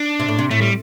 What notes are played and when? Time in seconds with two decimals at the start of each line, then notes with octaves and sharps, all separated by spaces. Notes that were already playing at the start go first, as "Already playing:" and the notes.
Already playing: D4
0.20 C3
0.28 A2
0.39 C3
0.51 A2 A3
0.62 G3